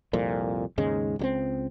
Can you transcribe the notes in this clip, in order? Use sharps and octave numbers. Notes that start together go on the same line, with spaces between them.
C2 F2 A#2
D#2 G#2 C#3 G#3
C#2 G3 C4